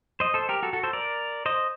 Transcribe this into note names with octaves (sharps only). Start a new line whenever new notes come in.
C5 D#5
A4 C5
G4 A#4
F#4 A4
F#4 A4
A4 C5
A#4 D5
C5 D#5